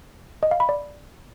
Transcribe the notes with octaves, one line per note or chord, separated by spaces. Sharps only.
D#5
F5
B5
D5